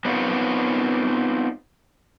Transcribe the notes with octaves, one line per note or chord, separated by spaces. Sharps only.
B3 C4 D#4 F4 A#4 C#5